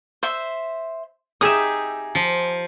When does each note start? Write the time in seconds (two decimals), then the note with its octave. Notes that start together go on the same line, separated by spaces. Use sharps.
0.23 C5 E5
1.41 D#4 G4 G#4 E5 D#6
2.15 F3